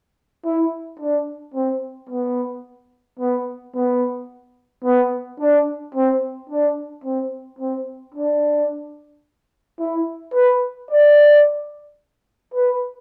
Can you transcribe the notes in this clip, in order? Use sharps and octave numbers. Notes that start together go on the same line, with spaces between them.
E4
D4
C4
B3
B3
B3
B3
D4
C4
D4
C4
C4
D4
E4
B4
D5
B4